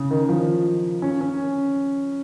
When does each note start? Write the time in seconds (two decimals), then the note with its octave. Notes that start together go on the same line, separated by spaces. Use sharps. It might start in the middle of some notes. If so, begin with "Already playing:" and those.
Already playing: C#3
0.11 D#3
0.29 F3
1.02 C#4
1.21 C#4